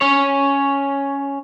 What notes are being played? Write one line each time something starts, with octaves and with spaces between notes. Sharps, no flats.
C#4 C#5